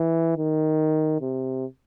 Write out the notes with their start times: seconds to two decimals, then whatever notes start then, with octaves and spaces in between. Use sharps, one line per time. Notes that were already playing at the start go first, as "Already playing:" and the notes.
Already playing: E3
0.37 D#3
1.21 C3